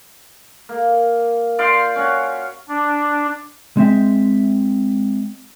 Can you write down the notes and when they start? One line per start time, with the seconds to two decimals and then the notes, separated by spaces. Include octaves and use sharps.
0.69 A#3
1.59 D5 F5 G5 C6
1.96 C#4 F#4
2.69 D4
3.77 G#3 C4 E5